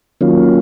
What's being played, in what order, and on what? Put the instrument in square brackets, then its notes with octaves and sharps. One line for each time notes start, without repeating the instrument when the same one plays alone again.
[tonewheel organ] D#3 F#3 A#3 C#4 F4